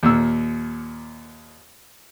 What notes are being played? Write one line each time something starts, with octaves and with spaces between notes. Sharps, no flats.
D#2 A#2 E6